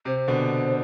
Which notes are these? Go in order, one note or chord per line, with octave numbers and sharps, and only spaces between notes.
C3 C5
B2 D3